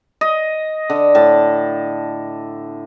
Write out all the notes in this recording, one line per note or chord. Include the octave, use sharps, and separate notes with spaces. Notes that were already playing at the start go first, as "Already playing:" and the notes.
D#5
D3
A2 A5